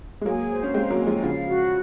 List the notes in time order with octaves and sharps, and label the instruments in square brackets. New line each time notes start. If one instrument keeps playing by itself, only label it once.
[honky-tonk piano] G#3
[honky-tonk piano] F#3 A#3 [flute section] G#4
[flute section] C5
[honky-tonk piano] C#4
[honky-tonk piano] G#3 C4 [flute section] F5
[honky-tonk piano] F#3 A#3
[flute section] G#5
[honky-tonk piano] F3 G#3
[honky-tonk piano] C#3 F3 [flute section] F5
[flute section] F#4